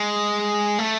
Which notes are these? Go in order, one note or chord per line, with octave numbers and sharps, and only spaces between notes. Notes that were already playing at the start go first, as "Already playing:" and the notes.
Already playing: G#3
A3